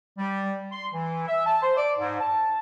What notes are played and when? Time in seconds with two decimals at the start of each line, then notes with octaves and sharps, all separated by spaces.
0.18 G3
0.72 C6
0.94 E3
1.28 E5
1.46 A5
1.63 C5
1.77 D5
1.99 G#2
2.20 A5